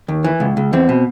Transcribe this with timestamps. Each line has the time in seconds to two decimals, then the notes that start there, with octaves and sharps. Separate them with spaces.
0.08 D#2
0.24 E3
0.40 C#2
0.57 C#2
0.73 E2 C4
0.89 B2